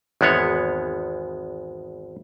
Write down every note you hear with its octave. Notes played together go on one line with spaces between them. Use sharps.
G#1 E2 G#3 B3 C#5